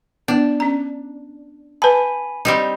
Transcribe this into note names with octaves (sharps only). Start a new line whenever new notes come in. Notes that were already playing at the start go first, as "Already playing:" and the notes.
B3 D4
C#4 A#5
B4 G#5 A5 B5
G3 C4 D#4